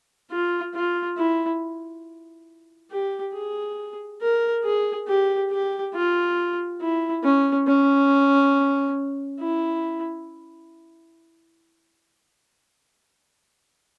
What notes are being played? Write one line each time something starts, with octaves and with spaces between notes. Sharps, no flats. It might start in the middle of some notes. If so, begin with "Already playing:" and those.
F4
F4
E4
G4
G#4
A#4
G#4
G4
G4
F4
E4
C#4
C#4
E4